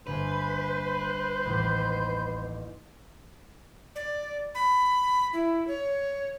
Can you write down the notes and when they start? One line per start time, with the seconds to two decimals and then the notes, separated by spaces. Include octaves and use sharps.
0.07 G1 A#3 B4 C5 G#5
1.45 A1 D#2 G6
3.96 D5
4.55 B5
5.33 E4
5.68 C#5